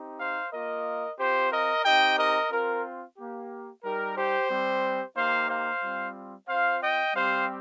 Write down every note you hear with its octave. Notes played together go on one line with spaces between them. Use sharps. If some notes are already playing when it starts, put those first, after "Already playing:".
Already playing: C4 D#4 G4
C5 F5
A#3 F4 A#4 D#5
C4 F4 G4 C5
A#4 D#5
C4 D#4 G4 D#5 G5
A#4 D#5
C4 F4 A#4
A#3 G4
G3 D#4 G4 A#4
G4 C5
G3 C4 G4
A#3 D#4 G4 C5 F5
C5 F5
G3 C4 F4
C4 F4 C5 F5
D#5 G5
G3 C4 G4 C5 F5